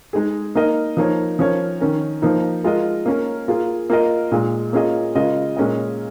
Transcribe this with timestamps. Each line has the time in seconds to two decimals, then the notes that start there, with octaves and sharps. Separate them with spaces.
0.13 G#3 D#4 G#4
0.55 A#3 D#4 A#4 D#5
0.97 F3 A#3 D#4 C#5
1.39 F3 C#4 A#4 C#5
1.80 D#3 C#4 A#4
2.22 F3 A#3 D#4
2.64 G#3 F4 A#4 D#5
3.06 A#3 C#4 A#4
3.48 A#3 F4 G#4
3.90 A#3 F4 A#4 D#5
4.32 A#2 G#3 F4
4.73 A#3 C#4 F4 G#4 D#5
5.15 C#3 G#3 F4 A#4 D#5
5.57 A#2 G#3 C#4 A#4 D#5